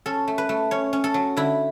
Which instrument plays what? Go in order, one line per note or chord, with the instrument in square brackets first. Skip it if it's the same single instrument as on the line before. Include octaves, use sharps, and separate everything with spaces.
[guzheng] C#4 A4
A3
B4
A3
C#4 C#5
C#4
A4
F#3
D3 E4